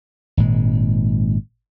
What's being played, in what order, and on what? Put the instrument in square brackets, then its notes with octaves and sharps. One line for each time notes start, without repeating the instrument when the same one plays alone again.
[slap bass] G#1 A#2 G#3